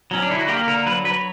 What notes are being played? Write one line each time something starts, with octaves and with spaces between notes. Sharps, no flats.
F#3 C#4
D4
D3 E4
F#4
A#3 G4
D3 A#4
F#3 B4
F#3 B4